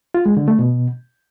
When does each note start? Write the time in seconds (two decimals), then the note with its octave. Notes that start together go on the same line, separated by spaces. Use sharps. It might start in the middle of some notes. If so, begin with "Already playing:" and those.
0.14 F4
0.26 G#3
0.37 D3
0.48 A3
0.59 B2